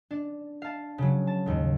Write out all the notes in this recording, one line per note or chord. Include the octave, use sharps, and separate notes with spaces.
D4
F5 A5
C#3 F#3
A5
D#2 G#2